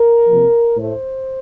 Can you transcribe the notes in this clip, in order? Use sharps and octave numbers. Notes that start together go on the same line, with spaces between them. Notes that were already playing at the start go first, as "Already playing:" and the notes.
Already playing: A#4
C3 F3 A#3
A2 A3 C5